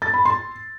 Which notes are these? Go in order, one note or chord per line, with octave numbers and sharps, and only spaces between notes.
A6
B5
C6